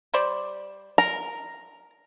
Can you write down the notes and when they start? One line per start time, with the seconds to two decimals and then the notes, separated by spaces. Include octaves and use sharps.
0.14 G3 C5 D5
0.98 A#4 A#5